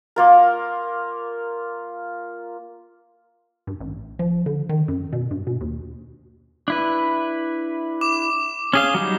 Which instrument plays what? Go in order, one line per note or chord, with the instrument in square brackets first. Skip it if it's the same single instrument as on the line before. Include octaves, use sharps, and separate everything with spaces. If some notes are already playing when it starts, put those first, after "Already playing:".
[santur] A#3 F4 A#4
[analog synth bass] G2
A1
F3
D3
D#3
F#2
B2
G2
B2
D#2
[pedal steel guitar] D4 E4 B4
[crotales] D6 E7
[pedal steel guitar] C#4 G#4 F5 [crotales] G7
[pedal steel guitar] F#3 G3 D#4